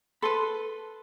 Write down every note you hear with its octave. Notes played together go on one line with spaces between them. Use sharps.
A4 B4 B5 C6